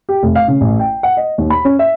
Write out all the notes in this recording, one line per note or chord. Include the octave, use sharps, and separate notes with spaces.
G4
F1
F5
C#3
A1
G5
F#5
D#5
D#2
B5
C#4
E5